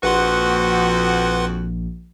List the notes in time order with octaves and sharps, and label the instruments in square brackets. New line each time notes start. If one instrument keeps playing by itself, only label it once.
[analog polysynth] A#1 [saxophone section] F2 F#4 [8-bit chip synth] B4 F#5 C6